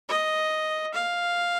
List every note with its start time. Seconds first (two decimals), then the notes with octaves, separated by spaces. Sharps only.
0.09 D#5
0.94 F5